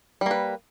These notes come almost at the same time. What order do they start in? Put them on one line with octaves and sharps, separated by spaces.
G3 A#3 B4